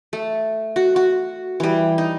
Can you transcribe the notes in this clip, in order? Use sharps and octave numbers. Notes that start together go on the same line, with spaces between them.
A3
F#4
F#4
E3 G3
D#4